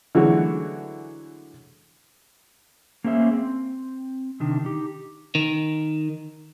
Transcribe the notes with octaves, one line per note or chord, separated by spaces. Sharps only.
D3 E3 F#3 G#3 A3 F#4
A#3 C#4 G#4 C5 E5
C4
C3 D#3 D4
D#4 G4
D#3